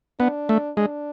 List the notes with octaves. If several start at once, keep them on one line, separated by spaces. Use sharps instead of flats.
B3 D4
A3
G#3 D4